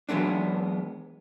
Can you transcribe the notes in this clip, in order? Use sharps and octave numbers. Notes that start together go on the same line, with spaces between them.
E3 F#3 G#3 B3 D4